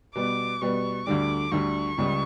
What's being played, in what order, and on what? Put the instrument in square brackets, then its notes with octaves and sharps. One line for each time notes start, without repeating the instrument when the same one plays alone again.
[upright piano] B2 G3 B3 [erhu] D6
[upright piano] B2 G3 B3 [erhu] C#6
[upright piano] D2 D3 G3 [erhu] D6
[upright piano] D2 D3 G3 [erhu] C#6
[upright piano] C#2 C#3 G3